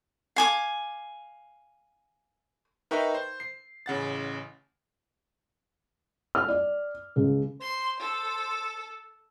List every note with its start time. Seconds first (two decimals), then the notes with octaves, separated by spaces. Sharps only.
0.36 F5 G#5 D6
2.91 D#4 A#4 B4 E5 G5 C#6
3.14 C5
3.40 C7
3.86 A1 C#3 F#5 A6
6.35 F6
6.48 D5
7.16 C#2
7.61 C5 C6
8.00 A4